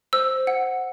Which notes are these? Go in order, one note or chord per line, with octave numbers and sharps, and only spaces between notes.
C5 E6
F#5